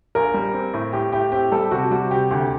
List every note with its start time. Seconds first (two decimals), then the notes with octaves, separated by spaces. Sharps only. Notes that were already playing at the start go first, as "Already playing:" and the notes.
0.15 A#1 A#4
0.34 G3
0.54 C4
0.73 A2
0.93 A2 G4
1.12 A2 G4
1.32 C4 G4
1.52 G3 A4
1.71 C3 F#4
1.91 G3 F#4
2.10 C3 G4
2.31 D2